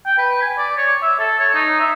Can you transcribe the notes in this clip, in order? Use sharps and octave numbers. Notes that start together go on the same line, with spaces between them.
G5
B4
G#5
D5
C#5
E5
A4
C#5
D#4
E5